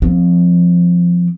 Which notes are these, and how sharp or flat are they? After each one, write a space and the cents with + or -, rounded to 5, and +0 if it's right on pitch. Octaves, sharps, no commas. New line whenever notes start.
F3 +5 C4 +0